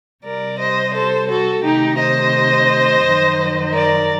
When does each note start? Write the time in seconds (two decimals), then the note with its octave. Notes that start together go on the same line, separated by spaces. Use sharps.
0.24 C3 G3 A#4 D5
0.58 C5 D#5
0.93 A4 C5
1.29 F#4 A4
1.63 C3 D#3 A3 D#4 G4
1.99 C5 D#5
3.03 F#2 D#3 F#3
3.73 A#4 D5